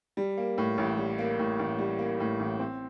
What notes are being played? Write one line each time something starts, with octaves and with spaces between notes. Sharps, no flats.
G3
A#3
A2
A1
G3
A#3
A2
A1
G3
A#3
A2
A1
C4